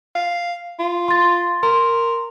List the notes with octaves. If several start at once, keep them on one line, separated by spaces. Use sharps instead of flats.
F5
F4
C6 A6
A#4 C6